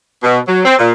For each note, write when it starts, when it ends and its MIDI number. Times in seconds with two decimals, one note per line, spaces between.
0.24 0.38 47
0.47 0.61 54
0.65 0.75 60
0.79 0.92 46